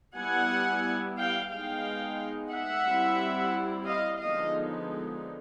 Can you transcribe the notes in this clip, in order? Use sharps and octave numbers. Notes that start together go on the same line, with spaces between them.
G3 B3 E4 F#5 G#5
F5 G5
G#3 B3 D#4 F5 G5
E5 F#5
G3 C4 E4
D#5 F5
D3 F3 G#3 B3 D#4 D#5 F5